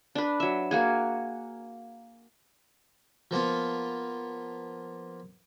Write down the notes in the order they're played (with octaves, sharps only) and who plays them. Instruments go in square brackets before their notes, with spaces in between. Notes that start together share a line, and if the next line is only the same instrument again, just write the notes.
[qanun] D4 B4
F#3 E5
A#3 F#4 G#4
[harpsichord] F3 A#3 B3 F4